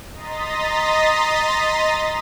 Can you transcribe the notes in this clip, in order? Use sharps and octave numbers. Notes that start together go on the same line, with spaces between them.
D#5 A#5 C6 D#6 A6 B6